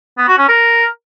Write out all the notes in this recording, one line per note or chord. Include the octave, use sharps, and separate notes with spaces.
B3
F#4
C#4
A#4